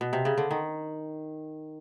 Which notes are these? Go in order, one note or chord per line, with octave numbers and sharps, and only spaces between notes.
B2
C3
C#3
D3
D#3